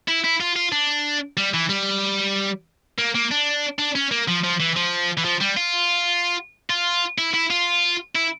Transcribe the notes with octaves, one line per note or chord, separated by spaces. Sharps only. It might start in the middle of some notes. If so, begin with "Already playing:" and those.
E4
E4
F4
F4
D4
G3
E3
G3
A#3
A#3
D4
D4
C#4
A#3
F3
F3
E3
F3
E3
F3
G3
F4
F4
E4
E4
F4
E4